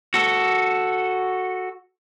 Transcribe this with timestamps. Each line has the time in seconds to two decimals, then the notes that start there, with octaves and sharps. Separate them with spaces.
0.14 F#4 A4